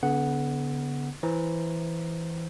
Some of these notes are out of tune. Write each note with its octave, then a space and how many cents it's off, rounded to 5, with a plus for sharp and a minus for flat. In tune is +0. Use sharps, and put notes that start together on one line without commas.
D3 -40 B3 +0 F#5 +0
E3 +0 C5 +0 A#5 +0